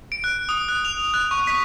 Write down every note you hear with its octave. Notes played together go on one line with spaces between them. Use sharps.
D7
F#6
D#6
F#6
F7
F#6
C#6
B6